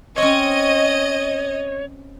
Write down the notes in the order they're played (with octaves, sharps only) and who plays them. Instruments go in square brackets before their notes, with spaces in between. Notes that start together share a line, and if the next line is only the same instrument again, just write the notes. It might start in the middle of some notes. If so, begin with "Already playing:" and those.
[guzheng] C4 C#4 [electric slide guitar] C#5 [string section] D#5